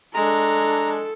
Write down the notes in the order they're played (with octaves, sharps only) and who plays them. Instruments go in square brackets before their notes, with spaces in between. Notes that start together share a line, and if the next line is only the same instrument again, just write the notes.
[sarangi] G#3 [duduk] D4 [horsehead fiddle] A4 [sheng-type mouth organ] A#5